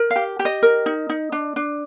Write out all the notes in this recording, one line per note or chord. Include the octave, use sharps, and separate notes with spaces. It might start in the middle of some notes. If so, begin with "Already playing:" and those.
Already playing: A#4
F5
G4
G4
D#5
A#4
D#4
D#4
D4
D4